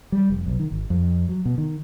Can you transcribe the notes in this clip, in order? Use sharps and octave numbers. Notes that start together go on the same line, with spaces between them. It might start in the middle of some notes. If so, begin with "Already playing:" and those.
G3
F1
B1
D#3
G#1
F2
F#3
B2
D#3